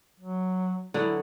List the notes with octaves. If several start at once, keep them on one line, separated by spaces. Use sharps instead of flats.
F#3
D3 F#3 B3 E4